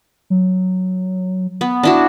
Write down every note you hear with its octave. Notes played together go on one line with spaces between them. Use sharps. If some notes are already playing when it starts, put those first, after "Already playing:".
F#3
B3
D4 E4 F#4